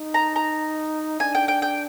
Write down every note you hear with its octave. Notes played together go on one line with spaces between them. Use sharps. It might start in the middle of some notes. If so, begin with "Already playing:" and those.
Already playing: D#4
A#5
A#5
D4 G#5
G5
G5
G5